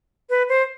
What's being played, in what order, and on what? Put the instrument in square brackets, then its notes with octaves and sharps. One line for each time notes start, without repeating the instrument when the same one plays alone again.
[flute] B4
C5